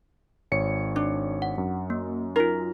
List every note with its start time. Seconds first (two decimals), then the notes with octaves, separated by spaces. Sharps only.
0.52 G#1 C#5 C#7
0.96 D4
1.42 F#5
1.58 F#2
1.90 A#3
2.36 D#4 F4 A#4